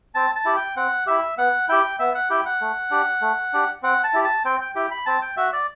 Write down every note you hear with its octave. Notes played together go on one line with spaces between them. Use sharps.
C4 A5
A5
E4 G4
G5
C4 F#5
E4 G4 E5
B3 F#5
E4 G4 G5
B3 E5
F#5
E4 G4 G5
F#5
A3
D4 G4
A3
D4 G4
C4 F#5
A5
E4 G4
A5
C4 G5
G5
E4 G4 G5
B5
C4 A5
G5
F#4 E5
D5